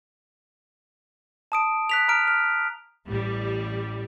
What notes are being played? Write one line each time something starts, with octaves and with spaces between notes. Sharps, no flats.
A5 D#6 D7
F#6 B6 F7
A#5 F6 D7
F6
A1 G3